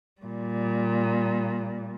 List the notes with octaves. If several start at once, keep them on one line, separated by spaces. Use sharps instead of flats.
A#2 G3